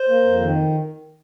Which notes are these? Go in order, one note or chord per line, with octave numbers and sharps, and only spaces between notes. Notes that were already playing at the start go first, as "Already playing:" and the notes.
Already playing: C5
A#3
F2
D#3